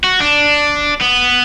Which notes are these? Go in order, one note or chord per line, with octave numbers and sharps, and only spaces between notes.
F#4
D4
B3